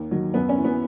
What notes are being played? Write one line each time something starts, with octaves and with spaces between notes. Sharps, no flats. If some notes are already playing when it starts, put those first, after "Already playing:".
Already playing: D#2
D#3 F#3
F#2 B3
C#4
E3
B3